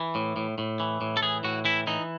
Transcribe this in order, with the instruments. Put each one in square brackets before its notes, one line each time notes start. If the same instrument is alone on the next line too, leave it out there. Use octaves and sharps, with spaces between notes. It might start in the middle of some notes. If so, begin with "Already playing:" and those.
Already playing: [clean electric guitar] E3
A2
A2
A2
E3
A2
A4
E3 G#4
A2 F#4
E3 E4
E3 D#4